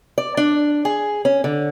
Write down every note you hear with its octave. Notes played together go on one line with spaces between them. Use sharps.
D5
D4
G#4
C#4
D3